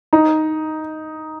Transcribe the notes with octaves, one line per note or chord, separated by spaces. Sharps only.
D#4